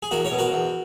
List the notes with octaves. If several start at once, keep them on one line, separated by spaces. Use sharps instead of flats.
G#4
E2 F#4 A#4
A#4 C#5
B2
F#4 A#4
E2